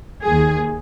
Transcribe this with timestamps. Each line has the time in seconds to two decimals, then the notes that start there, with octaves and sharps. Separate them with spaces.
0.24 D#2 D#3 G#4